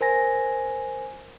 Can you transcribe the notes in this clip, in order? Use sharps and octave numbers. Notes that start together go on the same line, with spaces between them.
A#4 C5 G#5 A#6